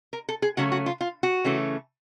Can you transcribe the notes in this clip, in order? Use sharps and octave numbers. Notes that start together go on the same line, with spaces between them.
A#4
A4
G#4
C#3 F#3 A3 C#4 F#4
F#4
F4
F4
F#4
C#3 E3 A3 C#4